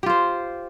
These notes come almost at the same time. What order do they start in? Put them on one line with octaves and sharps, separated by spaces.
G4 F4 C5